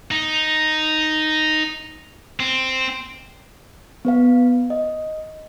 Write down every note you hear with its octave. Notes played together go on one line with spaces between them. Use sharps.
D#4
C4
B3 B4 F5
D#5